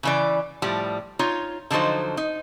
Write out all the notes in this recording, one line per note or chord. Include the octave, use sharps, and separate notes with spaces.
C#3 E3 D5
A2 F3 G3
D#4 F4 C#5
D3 F3 F#3 D#4 C5
D#4